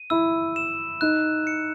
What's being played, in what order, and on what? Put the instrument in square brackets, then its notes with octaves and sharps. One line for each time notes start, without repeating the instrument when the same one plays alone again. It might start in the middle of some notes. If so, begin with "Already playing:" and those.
Already playing: [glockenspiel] D#7
[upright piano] E4 [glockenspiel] E6
[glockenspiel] E7
[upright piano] D#4 [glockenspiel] F#6
[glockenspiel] C#7